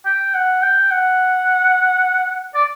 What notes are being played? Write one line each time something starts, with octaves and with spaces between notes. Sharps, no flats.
G5
F#5
G5
F#5
D5